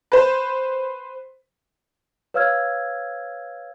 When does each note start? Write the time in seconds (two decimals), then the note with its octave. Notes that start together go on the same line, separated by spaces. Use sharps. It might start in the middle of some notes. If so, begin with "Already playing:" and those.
0.12 B4 C5
2.34 B4 C#5 F5 E6 F6 G#6